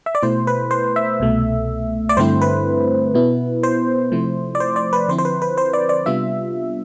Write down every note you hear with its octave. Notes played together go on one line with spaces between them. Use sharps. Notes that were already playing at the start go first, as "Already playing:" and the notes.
E5
D5
B2 A3 E4 C5
B4
C5
E5
C2 B2 A3
D5
G2 D3 A3 C4 E4 C5
B4
B2 B3 E4
C5
C3 F3 A3 E4
D5
C5
D5
B4
D3 F3 C4 E4 C5
C5
B4
B4
C5
D5
D5
C3 G3 B3 D4 F4 E5